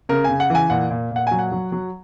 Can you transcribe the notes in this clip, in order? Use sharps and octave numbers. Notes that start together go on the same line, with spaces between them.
C#3 A#4
C#3 G#5
F#5
E3 G#5
A#2 F#5
A#2
A#2 F#5
F#3 G#5
F#5
F#3
F#3